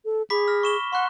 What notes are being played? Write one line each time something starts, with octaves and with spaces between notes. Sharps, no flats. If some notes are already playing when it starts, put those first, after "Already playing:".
A4
G#4 B5 D6 B6
F6 A#6
C#6 E7 G7
F#5 C6 C#6 F#6